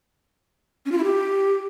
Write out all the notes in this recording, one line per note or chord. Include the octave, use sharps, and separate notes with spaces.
C#4
F4
E4
G4